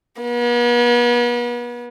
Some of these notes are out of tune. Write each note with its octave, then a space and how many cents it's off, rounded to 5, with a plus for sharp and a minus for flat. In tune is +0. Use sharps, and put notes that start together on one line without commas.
B3 -40